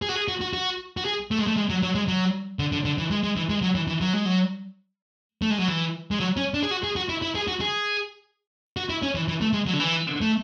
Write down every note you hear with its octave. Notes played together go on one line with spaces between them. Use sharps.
G#4
F#4
G#4
F#4
F#4
F#4
F#4
G#4
A3
G#3
A3
G#3
F#3
F#3
G#3
F#3
D3
D3
D3
E3
G#3
G#3
E3
G#3
F#3
E3
E3
F#3
G#3
F#3
A3
G#3
F#3
E3
G#3
F#3
C#4
D4
G#4
F#4
G#4
F#4
E4
E4
G#4
F#4
G#4
F#4
E4
C#4
E3
E3
A3
G#3
F#3
D3
E3
A3